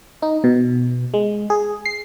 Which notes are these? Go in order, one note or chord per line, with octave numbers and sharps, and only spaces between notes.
D#4
B2
G#3
G#4
C7